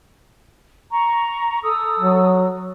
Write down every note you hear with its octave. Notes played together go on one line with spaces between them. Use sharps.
A#5 C#6
A4 D#6 E6
F#3